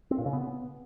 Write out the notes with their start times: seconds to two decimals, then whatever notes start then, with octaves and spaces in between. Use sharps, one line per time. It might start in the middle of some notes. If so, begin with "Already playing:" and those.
0.11 C4
0.18 A#2
0.26 C#3
0.33 B3